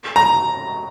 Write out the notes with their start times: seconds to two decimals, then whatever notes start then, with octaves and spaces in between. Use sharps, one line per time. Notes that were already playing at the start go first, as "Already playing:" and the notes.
0.16 A#5